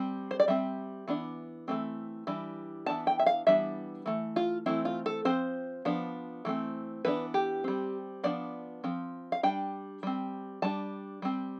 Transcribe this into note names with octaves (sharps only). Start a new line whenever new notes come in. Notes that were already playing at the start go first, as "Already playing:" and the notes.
Already playing: G3 C4
C5
D5
G3 C4 E5
E3 B3 D4
E3 A3 C4
E3 G3 D4
E3 B3 D4 A5
G5
E5
F5
E3 G3 B3 D4 E5
E3 A3
F4
E3 A3 C4 E4
F4
A4
F3 C4 C5
F3 B3 D4
E3 A3 C4
E3 B3 D4 B4
G4
G3 C4
F3 B3 D4 D5
F3 C4
F5
G3 D4 G5
G3 C4
G3 D4 A5
G3 C4